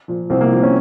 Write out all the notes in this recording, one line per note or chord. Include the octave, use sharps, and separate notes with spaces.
A#2 F3
C2 C4
A#3
A#2 F3 C4
C#4